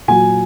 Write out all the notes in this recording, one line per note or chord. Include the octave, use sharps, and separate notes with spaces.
A#2 F#3 G#5